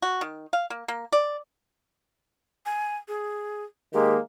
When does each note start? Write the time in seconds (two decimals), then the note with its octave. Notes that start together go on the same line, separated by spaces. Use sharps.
0.02 F#4
0.21 D#3
0.53 F5
0.70 A#3
0.88 A#3
1.12 D5
2.66 G#5
3.08 G#4
3.93 D#3 G#3 A#3 G4